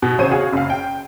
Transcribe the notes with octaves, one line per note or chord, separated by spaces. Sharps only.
B2
A1 C#3 C5 C#5 D#7
F#4 G#4 C#5 F5
F#1 F5
G5